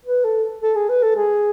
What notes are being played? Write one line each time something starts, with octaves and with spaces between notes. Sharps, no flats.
B4
A4
A4
G#4
B4
A4
G#4